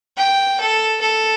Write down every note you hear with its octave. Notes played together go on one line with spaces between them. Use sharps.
G5
A4
A4